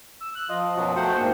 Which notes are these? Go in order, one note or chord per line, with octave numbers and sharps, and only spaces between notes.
E6
F#6
F3 F4 D#5
F#2 B2 F#3 F#4
A3 F#4 C5 F#5 G5
G#2 A#3 D4 G#4